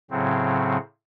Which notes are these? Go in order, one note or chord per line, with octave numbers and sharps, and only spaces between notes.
A2 C#3 F#3 C4